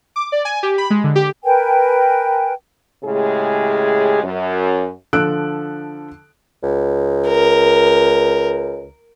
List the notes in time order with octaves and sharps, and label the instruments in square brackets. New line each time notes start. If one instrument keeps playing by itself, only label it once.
[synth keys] D6
D5
G#5
G4
B5
G#3
D3
G4
[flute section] A#4 B4 G5 G#5
[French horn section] A2 C#3 G#3 G4 G#4
F#2
[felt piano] D3 F3 A4 E6 F#6 D7
[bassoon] C#2
[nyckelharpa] A#4